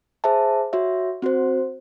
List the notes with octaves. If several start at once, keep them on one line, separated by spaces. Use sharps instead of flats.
G#4 C5 E5 A5
F#4 C#5 E5
C4 F#4 C5